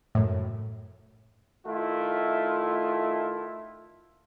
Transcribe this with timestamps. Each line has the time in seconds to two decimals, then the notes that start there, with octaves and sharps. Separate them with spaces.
0.15 F#2 A2
1.66 D#3 A3 E4 F4